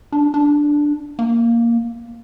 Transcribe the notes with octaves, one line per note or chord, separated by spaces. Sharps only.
D4
D4
A#3